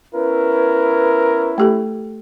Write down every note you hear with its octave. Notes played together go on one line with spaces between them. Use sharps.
B3 C#4 E4 A#4 B4
A3 G4 A4